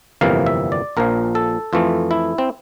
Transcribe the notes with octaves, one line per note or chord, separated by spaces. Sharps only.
G1 F2 C3 E3 A#3 F5
E5
D5
A#1 A#2 F3 A#4
A4
F2 E3 A3 F4
E4
C4